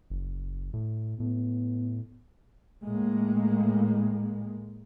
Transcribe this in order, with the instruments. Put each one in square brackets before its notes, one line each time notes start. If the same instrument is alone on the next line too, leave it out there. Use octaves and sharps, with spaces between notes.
[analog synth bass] F#1
A2
[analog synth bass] A2 [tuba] B3
[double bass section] A2 G#3 A#3